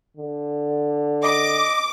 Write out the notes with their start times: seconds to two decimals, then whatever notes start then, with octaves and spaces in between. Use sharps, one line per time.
0.17 D3
1.23 D#5 D6